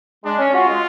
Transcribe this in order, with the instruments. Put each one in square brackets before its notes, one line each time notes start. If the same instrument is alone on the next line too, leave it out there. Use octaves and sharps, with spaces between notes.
[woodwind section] G#3 [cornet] D4
[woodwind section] C#4
[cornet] F4 [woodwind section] F#4
[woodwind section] G#3